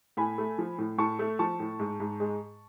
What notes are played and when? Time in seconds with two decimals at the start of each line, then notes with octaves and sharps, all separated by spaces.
0.17 A2 G#5 B5
0.38 A3
0.58 F3
0.78 A2
0.98 A2 A5 C#6
1.19 A3
1.39 F3 A5 C#6
1.60 A2
1.80 G#2
2.00 G#2
2.20 G#3